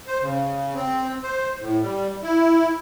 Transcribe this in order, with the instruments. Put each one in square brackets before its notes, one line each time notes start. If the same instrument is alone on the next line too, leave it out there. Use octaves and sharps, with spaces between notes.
[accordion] C5
C#3
C4
C5
A2
G3
E4